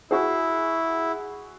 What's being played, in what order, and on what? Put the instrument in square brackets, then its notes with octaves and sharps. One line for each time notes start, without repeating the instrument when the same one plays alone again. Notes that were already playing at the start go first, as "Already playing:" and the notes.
[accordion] E4 [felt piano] F#4 G#4